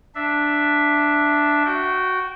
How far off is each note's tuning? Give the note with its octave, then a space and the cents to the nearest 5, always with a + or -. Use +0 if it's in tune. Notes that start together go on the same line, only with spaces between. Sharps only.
D4 +0 E5 +0
F#4 +0 G5 -25